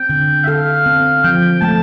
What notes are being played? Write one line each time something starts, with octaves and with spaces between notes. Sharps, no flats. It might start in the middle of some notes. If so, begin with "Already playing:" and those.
Already playing: C4 G5
D3
E5
A4 F5
C4
F3 G5
A3 A5